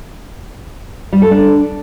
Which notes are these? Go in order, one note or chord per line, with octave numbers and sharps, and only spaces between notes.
G3
A4
D4